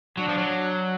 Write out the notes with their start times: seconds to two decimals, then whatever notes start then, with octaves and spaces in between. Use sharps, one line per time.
0.17 F#3 D4
0.28 F3
0.38 F#3